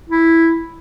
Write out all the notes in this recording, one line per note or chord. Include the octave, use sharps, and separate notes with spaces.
E4